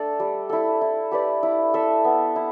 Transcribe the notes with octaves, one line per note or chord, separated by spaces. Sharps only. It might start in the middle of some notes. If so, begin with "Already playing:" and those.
Already playing: A3 D4 A4 D5
G3
E4 A4
E4
G4 B4 D5
E4
A4 E5
B3
E4